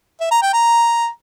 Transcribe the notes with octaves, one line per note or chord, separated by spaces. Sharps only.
E5
A#5
G5
A#5